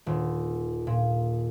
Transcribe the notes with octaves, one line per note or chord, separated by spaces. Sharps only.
D#1
A#2